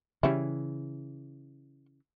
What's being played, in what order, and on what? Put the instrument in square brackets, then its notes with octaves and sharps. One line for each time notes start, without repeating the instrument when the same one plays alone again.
[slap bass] C#3 E3 [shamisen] G3 C#4 E4